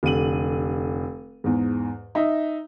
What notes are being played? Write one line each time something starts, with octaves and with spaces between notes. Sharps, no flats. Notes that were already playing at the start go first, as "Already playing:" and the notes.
F1 D3 D#7 F#7
E2 G#2
D#4 E5